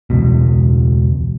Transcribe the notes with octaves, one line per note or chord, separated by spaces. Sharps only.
E1 C#2 B2